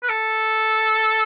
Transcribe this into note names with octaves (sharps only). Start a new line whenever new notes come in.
B4
A4